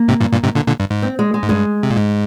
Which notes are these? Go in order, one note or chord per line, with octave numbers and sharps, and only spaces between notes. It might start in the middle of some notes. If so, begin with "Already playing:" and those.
Already playing: A#3
G#2 C3
G2 A#2
G2 A#2
G#2 C3
A#2 D3
A#2 D3
G2
G#2
C4
G#3
G#3
G#2
G2 G#3
C3
A#2
G#2